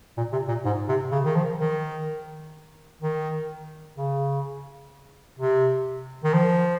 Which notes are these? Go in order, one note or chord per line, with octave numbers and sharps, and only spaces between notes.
A#2
C3
A#2
G#2
C3
C#3
D#3
F3
D#3
D#3
C#3
C3
D#3
F3